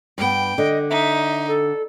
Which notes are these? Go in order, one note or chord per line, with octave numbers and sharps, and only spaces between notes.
G2 B3 G5
D3 D#5
D#4 E5
A4